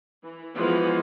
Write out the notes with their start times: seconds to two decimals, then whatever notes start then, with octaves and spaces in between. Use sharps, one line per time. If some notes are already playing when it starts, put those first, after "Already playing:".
0.24 E3
0.55 E3 F3 G#3 B3 F4 F#4